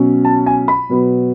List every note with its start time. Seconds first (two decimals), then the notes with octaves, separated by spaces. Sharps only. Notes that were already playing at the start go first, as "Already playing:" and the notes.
Already playing: B2 F#3 C#4
0.25 A5
0.46 G#5
0.68 B5
0.89 B2 F#3 B3